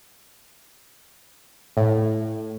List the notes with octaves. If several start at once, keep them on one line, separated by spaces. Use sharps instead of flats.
A2